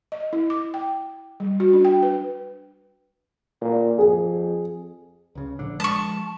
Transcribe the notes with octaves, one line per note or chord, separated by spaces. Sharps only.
D#5
E4
D6
G5
G3
F#4
D4
G5
B4
A#2
F2 G#4
C#2 C#3
A#1 D3 D4
F3 G#3 A5 C#6